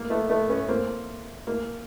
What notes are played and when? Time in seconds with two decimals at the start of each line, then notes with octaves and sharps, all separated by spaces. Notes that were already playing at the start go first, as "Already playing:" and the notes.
Already playing: A#3
0.10 A3 B3
0.29 A3 B3
0.49 B3 C#4
0.69 A#3 C4
1.47 A#3